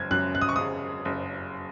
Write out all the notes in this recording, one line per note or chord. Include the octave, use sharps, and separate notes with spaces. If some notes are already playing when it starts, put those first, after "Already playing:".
Already playing: F#1 G#6
F#2 F#6
F#6
D#6
C#6
C#3 D#6
F#1